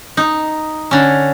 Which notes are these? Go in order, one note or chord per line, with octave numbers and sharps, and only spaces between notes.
D#4
D3 C#4